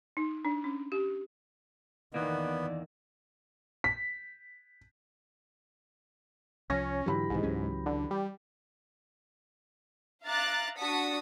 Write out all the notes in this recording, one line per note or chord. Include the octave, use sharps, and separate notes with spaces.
D#4
D4
C#4
G4
E2 D#3 E3 A#3 B3 D5
B6
C2 F3 C#4 A#6
G#2 D3 E3 F#3 G4 B5
B1 G#2 B2 D#3
C#2 F#3 C#4
D3
G3
E5 F5 A#5 D6 F#6 A6
D4 F#4 A5 D#6 B6 C#7